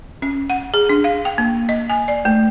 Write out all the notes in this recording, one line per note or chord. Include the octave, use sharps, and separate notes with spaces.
C#4
F#5
G#4
D4
F5
G5
A#3
D#5
G#5
D5
A3